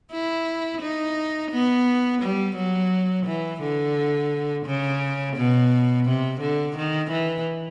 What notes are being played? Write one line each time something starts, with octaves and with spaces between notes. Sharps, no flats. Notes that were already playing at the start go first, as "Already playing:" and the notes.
E4
D#4
B3
G3
F#3
E3
D3
C#3
B2
C3
D3
D#3
E3